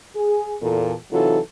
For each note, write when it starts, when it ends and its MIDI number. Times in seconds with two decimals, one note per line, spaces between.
0.15 0.55 68
0.62 0.94 40
0.62 0.94 46
0.62 0.94 69
1.12 1.38 48
1.12 1.38 52
1.12 1.38 54
1.12 1.38 63
1.12 1.38 65
1.12 1.38 69